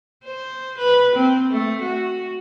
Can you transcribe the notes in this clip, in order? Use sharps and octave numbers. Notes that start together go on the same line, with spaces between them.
C5
B4
C4
A3
F#4